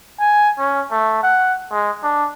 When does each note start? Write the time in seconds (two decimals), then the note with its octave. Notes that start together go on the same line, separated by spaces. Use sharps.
0.19 G#5
0.59 C#4
0.91 A3
1.23 F#5
1.71 G#3
2.03 D4